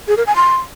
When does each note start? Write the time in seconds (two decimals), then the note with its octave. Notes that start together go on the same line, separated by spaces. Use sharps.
0.08 G#4
0.17 A#4
0.27 G#5
0.36 C6